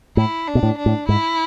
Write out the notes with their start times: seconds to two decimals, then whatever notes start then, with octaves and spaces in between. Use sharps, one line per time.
0.17 A2 E4
0.48 D4
0.55 B2
0.63 A2
0.78 D4
0.86 A2
1.09 G#2 E4